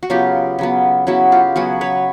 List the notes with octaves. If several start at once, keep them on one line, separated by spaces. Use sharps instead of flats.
F#4
C#3 F#3 B3 F4 G4
C#3 F#3 B3
C#3 F#3 B3 E4 F#4
F4 G4
C#3 F#3 B3 F#4 G#4
B4 C#5